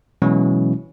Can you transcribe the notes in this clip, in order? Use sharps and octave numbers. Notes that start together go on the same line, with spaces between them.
B2 E3 F#3 G#3 C#4 E4